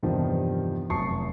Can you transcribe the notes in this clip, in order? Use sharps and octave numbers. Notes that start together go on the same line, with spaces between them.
E2 G2 C3 D#3 F3
F1 F#2 A5 C#6 C7